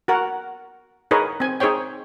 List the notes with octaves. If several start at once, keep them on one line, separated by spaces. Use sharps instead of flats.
F#4 A#4 F#5
D#4 G#4 A#4 B4 C#5 D#5
C4 G#5
D#4 G#4 C5 C#5 G5